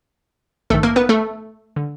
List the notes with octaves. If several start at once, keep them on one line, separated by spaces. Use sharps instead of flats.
A#1 G#2 D#3 A3 A4
A#3 A#4
B3 B4
A3 A4
D3